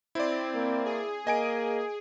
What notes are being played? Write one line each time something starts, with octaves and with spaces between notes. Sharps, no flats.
C4 E4 D5
A#3
G#4
A#3 D#5 G#5 D7